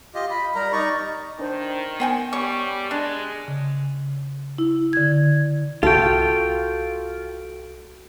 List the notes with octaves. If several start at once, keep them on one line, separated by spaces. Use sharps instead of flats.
F4 G4 D#5
B5
G3 A#4 A#5
D#4 D5 A#5 C#6
D#3 D4 C5 G6
B3 C5 G5 G#5 C#7
G3 C#5 C#6
G#3 D4 F#6
C#3
E4
D3 G#6
C2 F4 F#4 A4 G5 C#6